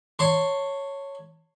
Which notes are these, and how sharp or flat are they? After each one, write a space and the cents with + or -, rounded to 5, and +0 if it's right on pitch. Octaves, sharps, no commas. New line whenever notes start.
C#5 +0 A5 +30 C6 +0